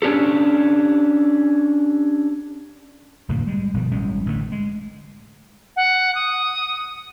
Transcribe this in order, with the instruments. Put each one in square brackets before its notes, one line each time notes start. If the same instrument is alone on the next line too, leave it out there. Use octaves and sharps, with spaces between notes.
[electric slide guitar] C#4 D4 G4 A4
[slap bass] F1 A2 D3 A#3
G3 G#3
G1 B2 F3 G3
A1 G3 G#3 C#4
A1 D3 F#3 A3
G#3
[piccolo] F#5
D#6